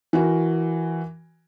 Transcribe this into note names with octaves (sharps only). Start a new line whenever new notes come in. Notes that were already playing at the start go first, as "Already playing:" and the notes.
E3 F#4 A#4